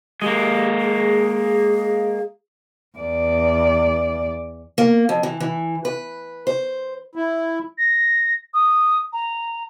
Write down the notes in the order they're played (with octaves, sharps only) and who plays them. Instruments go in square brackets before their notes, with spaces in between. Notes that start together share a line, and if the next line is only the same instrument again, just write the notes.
[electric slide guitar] G#3 A#3 [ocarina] G4
[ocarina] G#4
[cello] E2 D5
[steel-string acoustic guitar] A#3
F2
E3
E3
B4
C5
[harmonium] E4
[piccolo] A#6
D#6
A#5